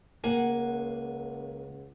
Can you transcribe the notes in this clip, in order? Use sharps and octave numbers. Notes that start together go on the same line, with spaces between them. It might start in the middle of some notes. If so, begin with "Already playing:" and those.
C#2 A#3 F#5 G#5